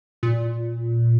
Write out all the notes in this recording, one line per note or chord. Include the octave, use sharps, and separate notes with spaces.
A#2